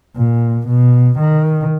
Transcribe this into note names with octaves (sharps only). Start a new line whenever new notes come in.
A#2
B2
D#3